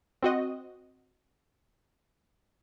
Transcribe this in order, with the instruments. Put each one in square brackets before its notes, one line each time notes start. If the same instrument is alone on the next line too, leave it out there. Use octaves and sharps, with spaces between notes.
[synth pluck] C4 F#4 D#5